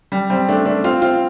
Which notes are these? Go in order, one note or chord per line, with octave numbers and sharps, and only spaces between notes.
G3
G3 C4
A3 D4
A3 D4
C4 F4
C4 F4